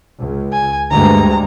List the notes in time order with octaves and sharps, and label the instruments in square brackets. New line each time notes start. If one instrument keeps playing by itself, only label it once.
[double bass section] C#2
[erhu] G#5
[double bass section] D2 G2 G#3 [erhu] A#5